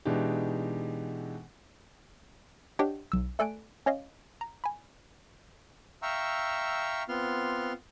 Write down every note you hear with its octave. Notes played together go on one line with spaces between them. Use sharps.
B2 E3 G#3 D4 D#4 G4
D4 G4 C#5 D#5 F#5 G5
B1 E6
A3 A4 D5 G#5 F#6 D7
C#4 C#5 D#5 F5
A#5
G#5 B5
E5 F5 G5 A#5 C#6 E6
B3 C4 F4 C6 F6